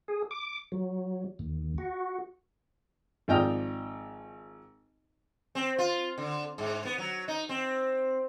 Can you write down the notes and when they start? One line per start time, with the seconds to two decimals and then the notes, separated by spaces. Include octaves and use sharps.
0.08 G#4
0.31 D6
0.72 F#3
1.39 D#2
1.78 F#4
3.28 G#1 F3 D5 D#5 G5 F6
5.55 C4
5.78 F4
6.18 D3
6.58 G#2
6.85 B3
6.98 F#3
7.28 D#4
7.49 C4